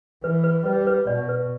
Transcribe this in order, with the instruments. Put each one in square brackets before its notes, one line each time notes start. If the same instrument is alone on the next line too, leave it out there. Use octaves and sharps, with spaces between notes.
[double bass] E3 [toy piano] B4
[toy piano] B4
[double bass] G3 [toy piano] B4
[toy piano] B4
[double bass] B2 [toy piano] D5
[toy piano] B4